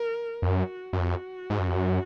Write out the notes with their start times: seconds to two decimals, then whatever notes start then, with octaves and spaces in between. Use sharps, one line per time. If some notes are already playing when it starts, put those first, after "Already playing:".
Already playing: A#4
0.42 F2
0.48 F#2 F#4
0.93 F#2
0.99 F2 F#4
1.50 G#2
1.59 F#2
1.67 F2
1.76 F#2